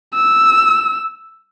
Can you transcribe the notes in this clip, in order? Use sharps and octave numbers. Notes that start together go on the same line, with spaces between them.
E6